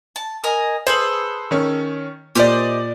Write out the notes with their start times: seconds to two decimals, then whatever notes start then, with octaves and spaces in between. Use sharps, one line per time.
0.16 A5
0.44 A#4 D#5 G#5
0.87 G#4 A4 B4 C5
1.51 D#3 C#4
2.35 A#2 G4 C5 D5 D#5